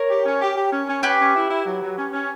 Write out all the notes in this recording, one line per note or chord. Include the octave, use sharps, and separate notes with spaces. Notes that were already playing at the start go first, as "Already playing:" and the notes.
Already playing: A#4 C#5
G4
C#4
G4
G4
C#4
C#4
C#4 G4 B4
C#4
E4
E4
F#3
F#3
C#4
C#4